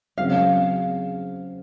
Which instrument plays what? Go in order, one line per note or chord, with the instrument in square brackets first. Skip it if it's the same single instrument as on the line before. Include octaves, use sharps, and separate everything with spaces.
[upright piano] C#3 F#3 C4 [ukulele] F5